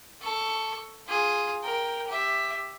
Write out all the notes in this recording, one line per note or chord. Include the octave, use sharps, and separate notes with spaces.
A4 C#6
F4 G#4
A#4 G5
G4 E5